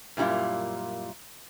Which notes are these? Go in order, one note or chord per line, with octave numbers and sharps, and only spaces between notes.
F#2 A#2 G3 E4 F4